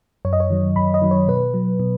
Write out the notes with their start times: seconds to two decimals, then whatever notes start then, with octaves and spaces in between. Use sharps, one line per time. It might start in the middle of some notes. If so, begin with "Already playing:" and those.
0.25 F#2 C#5
0.33 D#5
0.40 C#5
0.50 D#3 F#3
0.76 F#2 B5
0.94 D#5
1.02 D#3 F#3
1.11 C#5
1.28 B2 B4
1.54 F#3
1.80 B2